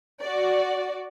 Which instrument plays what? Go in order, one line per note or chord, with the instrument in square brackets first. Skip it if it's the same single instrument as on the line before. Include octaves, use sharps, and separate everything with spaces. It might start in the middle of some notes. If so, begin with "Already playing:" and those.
[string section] F#4 D5